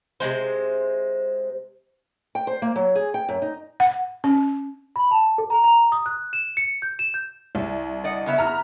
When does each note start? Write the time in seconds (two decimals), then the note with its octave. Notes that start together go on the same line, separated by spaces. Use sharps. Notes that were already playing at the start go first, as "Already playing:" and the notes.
0.20 C3 G3 G#3 C5
2.35 G5
2.47 C5
2.62 A#3
2.76 F#3
2.96 G#4
3.14 G5
3.29 F#2
3.42 D#4
3.80 F#5
4.24 C#4
4.96 B5
5.11 A5
5.38 A4
5.50 A#5
5.64 A#5
5.92 D#6
6.06 F#6
6.33 E7
6.57 C#7
6.82 G6
6.99 E7
7.14 G6
7.55 C2
8.04 D5 D#5 F#5
8.26 C#3 B3 E5
8.38 A#5 F6